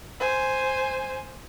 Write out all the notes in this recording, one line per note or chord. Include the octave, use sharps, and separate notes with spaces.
C5 G#5